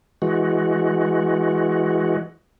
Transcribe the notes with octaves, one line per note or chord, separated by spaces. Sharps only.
E3 G#3 F#4